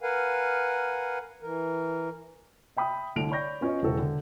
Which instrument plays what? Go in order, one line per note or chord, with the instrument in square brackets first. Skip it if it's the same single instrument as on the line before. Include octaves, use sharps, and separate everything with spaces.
[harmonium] A#4 B4 F5 F#5 G#5
E3 A#4
[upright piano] E5 G5 B5 D#6
C2 A2 D3 D7 F7
C#5 D5 B5 C#6 G6 A#6
B3 C#4 F4 C#5 D#5
E1 C#3 E3 F#4 A4 A#4
D3